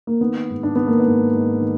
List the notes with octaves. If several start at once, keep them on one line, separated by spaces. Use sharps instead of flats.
A#3
D#3 B3
G#2
D4
D#3 B3
A#3
B3
G#2
G#2
D#3